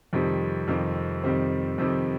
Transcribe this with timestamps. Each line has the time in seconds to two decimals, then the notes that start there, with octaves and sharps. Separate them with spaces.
0.13 F2 C3 D#3 G3 C4
0.68 F2 C3 D#3 G3 C4
1.23 F2 C3 D#3 G3 C4
1.78 F2 C3 D#3 G3 C4